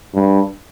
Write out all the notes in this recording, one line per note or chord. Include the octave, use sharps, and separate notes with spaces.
G2